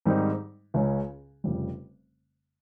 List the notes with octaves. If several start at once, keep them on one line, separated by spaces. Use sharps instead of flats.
G#2 D#3 G3 C4 D#4
C#2 C#3 G#3 C#4
F1 F2 C#3 G3